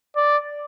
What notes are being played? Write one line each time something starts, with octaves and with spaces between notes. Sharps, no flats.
D5